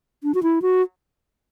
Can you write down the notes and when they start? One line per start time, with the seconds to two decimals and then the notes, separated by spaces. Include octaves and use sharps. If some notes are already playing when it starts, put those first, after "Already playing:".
0.24 D4
0.34 F#4
0.43 E4
0.62 F#4